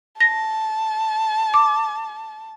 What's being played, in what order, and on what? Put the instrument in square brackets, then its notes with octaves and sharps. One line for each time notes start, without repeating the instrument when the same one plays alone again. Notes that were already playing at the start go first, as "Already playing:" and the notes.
[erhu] A5 [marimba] A#6
[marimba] D6